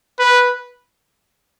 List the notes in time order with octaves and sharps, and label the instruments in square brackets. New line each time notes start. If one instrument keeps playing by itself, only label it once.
[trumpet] B4